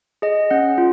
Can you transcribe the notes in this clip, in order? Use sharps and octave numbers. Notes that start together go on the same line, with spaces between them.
G#4 D#5
C#4 F#5
F4